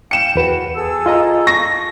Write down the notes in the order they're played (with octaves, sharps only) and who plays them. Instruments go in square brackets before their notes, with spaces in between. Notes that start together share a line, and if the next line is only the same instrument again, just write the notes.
[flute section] F5 G5 [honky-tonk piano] C#7 E7
[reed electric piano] E2 B4 [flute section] F#4
[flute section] G#4 A4 E6
[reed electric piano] F4 D#5 A#5
[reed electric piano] C#6 [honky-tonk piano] A#6